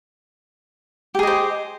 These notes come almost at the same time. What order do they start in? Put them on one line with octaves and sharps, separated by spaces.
G4 G#4 D#5 C5